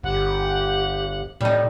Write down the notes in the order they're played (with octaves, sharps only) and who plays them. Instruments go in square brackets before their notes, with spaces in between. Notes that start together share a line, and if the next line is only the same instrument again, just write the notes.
[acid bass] G1 [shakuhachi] G4 [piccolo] F#5
[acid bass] A2 [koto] G3 D#4